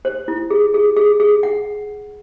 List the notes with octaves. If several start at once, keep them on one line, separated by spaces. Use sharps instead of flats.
C5
E4
G#4
G#4
G#4
G#4
F#5